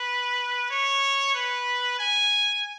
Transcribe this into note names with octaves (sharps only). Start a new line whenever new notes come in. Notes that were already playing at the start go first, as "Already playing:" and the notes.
Already playing: B4
C#5
B4
G#5